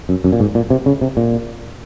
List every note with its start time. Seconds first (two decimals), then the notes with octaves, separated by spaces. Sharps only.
0.09 F#2
0.24 F#2
0.32 A#2
0.40 G#2
0.55 A#2
0.70 C3
0.86 C#3
1.01 C3
1.17 A#2